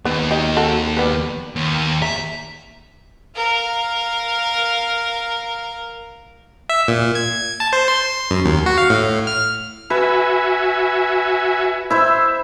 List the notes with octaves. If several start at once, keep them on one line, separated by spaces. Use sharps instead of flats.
D#2 D#3 B3
D#4 G4 D#5
C4 F#4 A4
G3 B3 B4
D#2
E5 A#5
A#4 F5
E5
A#2
G#6
A5
C5
C6
F#2
D#2
F#4
F5
A2
F6
F#4 B4 E5 G#5
E4 C5 E5